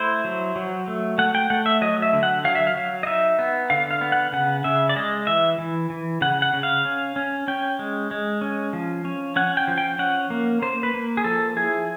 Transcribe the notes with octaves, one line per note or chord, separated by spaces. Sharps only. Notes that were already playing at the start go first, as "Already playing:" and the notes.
Already playing: A3 E4 C5
F#3
F#3
A3
A3 F#5
G5
A3 F#5
E5
F#3 D#5
E5
D3
F#5
F#3 F5
E5
F5
F#3
D#5
D#4 E5
B3
D3 F5
F5
B3
F#5
C#3 F#5
C#3 E5
D5
G#3 D#5
E3 E5
E3
E3
C#3 F#5
F#5
C#3
F5
C#4
C#4
C#4 G5
G#3
G#3
C#4
F3
C#4
C#4 F#5
G5
F3
G5
C#4 F#5
A#3
A#3 C5
B4
A#3
G#4
F3 A4
E4 G#4